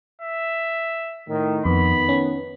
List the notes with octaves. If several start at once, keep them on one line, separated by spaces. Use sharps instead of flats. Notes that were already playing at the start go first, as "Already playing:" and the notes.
E5
A2 D#3
F2 D#3 B3 B5
C#4